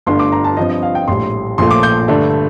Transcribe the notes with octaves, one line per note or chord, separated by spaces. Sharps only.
G1 G2 D3 A3 C6
D6
A#5
A5
G2 F3 C4 D#5
D#5
F5
G5
A#1 A2 G3 C6
A#1 A#2 F3 A3 C6
D6
G6
G2 D3 A3 D4